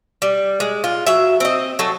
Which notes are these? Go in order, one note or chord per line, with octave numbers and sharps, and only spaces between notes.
G3
G#3
F4
F#3 E5
C4 D#5
F#3 A3 A4